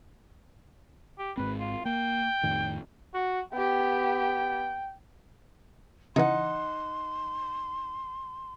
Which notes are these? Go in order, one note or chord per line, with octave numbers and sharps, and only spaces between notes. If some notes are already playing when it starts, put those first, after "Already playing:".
G4
G#1 G#2 C4 B4
F4
A#3 G5
F2 A2 D#3
F#4
B3 G4 G5
C#3 E3 D#4 F#5 C6